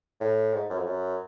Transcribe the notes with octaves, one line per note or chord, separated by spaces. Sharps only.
A2
G#2
F#2
F2
F#2